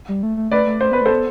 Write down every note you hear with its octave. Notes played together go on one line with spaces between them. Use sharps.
G3
A3
A3
A3 B4 D5
A3
A3 C5
B3 B4
A3
B3 A4 C5